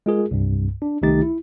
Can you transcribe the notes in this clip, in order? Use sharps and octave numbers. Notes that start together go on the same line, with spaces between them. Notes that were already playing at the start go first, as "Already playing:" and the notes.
G#3 F4 G#4 A#4
C2 G2
D4
C2 D#3 A3 D#4 G4 A6
E4